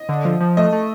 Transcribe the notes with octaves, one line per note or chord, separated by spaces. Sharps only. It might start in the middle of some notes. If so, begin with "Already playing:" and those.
Already playing: D#5
D3
F3
F3
A3 D#5
A3